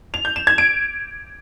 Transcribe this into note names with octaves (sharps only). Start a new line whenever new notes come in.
F7
G6
E7
G#6
D7